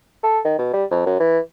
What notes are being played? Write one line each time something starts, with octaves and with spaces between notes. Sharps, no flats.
A4
D#3
B2
G3
F2
F#2
E3